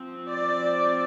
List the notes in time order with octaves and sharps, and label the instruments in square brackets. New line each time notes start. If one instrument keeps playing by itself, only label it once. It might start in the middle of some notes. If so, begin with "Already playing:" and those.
Already playing: [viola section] F3 C4
D5